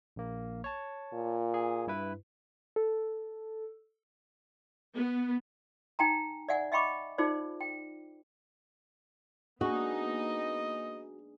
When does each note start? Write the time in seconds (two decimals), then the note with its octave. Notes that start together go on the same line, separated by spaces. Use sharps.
0.16 A#1 A#3
0.64 C#5 A5
1.13 A#2
1.54 G#4
1.87 G2 E4 B4
2.76 A4
4.95 B3
5.99 D#4 G5 G#5 A#5
6.49 D5 E5 F#5 G#5
6.72 D#5 E5 G5 B5 C#6 D6
7.18 D#4 F4 G#4 C5 D5
7.61 G5
9.61 A#3 B3 D4 D#4 F#4 G#4 D#5